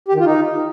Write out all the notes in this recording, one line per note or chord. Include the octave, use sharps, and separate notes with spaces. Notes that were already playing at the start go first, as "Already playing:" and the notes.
G4
D#3
F4
D#4